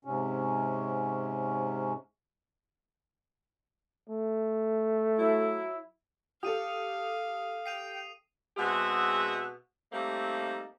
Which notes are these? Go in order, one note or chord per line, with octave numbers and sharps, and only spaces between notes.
G#2 C3 C#4
A3
F#3 E4
G4 A4 F5 D#6 D#7 F7
G5 C7 D#7 F7
B2 G#3 C4 G#4 E5 F#5
G3 A3 A#3 C4 D#4